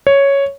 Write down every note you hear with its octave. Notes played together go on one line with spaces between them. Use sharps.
C#5